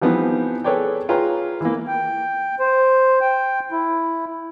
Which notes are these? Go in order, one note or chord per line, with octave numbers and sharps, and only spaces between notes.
E3 F3 G3 B3 C4 D#4
G#4 A4 B4 C#5 D5 G5
F4 G#4 B4 C#5 G5 A#5
E3 A#3
G5
C5
G5
E4